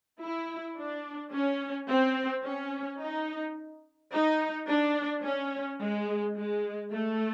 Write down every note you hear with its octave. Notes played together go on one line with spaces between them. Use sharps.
E4
D4
C#4
C4
C#4
D#4
D#4
D4
C#4
G#3
G#3
A3